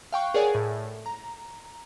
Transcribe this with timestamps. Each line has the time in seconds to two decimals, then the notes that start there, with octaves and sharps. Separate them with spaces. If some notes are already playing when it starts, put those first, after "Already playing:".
0.12 F5 G5 C#6 F#6
0.34 G#4 A#4 C#5 D5 F#5 G#5
0.55 A2
1.06 A#5